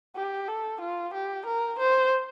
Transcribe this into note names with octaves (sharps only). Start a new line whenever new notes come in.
G4
A4
F4
G4
A#4
C5